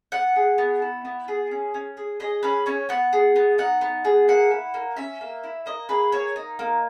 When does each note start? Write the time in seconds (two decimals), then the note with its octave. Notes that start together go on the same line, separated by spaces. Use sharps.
0.12 B3 F#5
0.36 G#4
0.58 B3
0.82 E4
1.05 B3
1.28 G#4
1.51 C#4
1.74 C#4
1.97 G#4
2.20 G#4 D#5
2.43 C#4 B4
2.66 C#4 C#5
2.89 B3 F#5
3.13 G#4
3.36 B3
3.58 D#4 F#5
3.81 B3
4.05 G#4
4.28 A#3 F#5
4.51 E4
4.74 A#3
4.97 C#4 E5
5.21 A#3
5.43 E4
5.66 A#3 D#5
5.89 G#4 B4
6.12 A#3 C#5
6.36 D#4
6.59 A#3